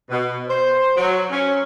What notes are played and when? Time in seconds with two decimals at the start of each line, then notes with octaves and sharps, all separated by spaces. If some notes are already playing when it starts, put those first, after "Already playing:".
0.11 B2
0.49 C5
0.96 F#3
1.31 C#4